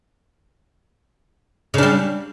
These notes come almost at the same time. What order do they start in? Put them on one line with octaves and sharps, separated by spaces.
C#3 D4 G3